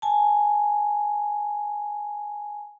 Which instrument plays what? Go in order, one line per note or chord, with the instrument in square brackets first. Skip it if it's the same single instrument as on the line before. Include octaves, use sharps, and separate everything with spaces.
[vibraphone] G#5 A5